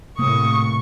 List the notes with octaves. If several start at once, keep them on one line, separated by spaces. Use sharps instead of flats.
A2 C3 A#3 C#6 D#6